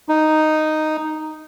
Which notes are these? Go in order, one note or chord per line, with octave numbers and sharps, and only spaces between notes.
D#4